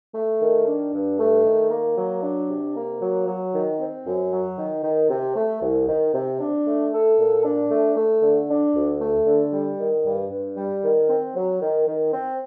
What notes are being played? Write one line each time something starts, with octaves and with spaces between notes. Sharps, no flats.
A3
D#3
D4
G2
A3
D#3
A#3
F#3
D4
C3
A#3
F#3
F#3
D#3
C4
F#2
F#3
D#3
D#3
C3
A3
C2
D#3
C3
D4
A3
A4
A#2
D4
A3
A3
D3
D4
D2
A3
D3
G3
D#3
G2
G2
G3
D#3
C4
F#3
D#3
D#3
C4